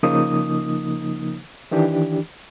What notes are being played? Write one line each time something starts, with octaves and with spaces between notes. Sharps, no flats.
C#3 F3 A#3 D#4 D#6
D#3 E3 D4 G4